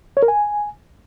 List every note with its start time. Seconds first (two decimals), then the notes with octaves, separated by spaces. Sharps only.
0.17 C#5
0.22 A#4
0.28 G#5